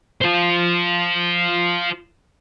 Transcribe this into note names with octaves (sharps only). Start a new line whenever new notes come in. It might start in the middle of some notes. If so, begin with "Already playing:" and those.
F4 C5